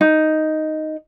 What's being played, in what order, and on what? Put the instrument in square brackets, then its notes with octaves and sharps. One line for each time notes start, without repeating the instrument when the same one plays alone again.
[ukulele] D#4